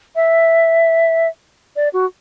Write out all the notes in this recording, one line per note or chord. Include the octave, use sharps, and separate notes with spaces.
E5
D5
F#4